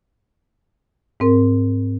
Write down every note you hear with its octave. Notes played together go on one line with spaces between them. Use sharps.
G#2 C4 A#4